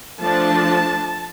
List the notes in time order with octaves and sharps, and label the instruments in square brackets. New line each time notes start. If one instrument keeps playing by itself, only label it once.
[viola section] F3 A3 D4 A5